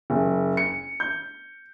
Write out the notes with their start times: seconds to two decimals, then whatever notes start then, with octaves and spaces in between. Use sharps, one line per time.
0.10 F#1
0.57 C#7
1.00 G6